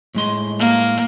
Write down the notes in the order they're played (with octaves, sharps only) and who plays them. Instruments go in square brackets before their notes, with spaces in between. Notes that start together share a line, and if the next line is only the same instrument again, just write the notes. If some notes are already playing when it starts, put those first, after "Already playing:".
[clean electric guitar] A2 G#3 C6
[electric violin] A#3